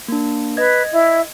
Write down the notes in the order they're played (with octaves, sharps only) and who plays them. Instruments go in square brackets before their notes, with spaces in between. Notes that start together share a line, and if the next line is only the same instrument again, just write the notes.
[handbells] A#3 D4
[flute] B4 [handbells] D#5 G#6
[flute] E4